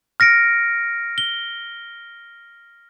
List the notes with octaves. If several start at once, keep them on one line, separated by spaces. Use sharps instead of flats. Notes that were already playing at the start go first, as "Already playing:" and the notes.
F6 A#6 C#7 D7
G7